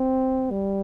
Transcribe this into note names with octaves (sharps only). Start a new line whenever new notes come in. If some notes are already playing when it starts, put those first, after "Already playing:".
Already playing: C4
G3